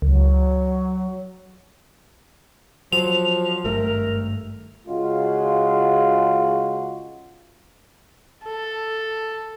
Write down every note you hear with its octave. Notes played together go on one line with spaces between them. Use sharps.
C#2 F#3
F3 F#3 F7
G#1 G2 A3 A#4
C#3 G#3 F4 F#4
A4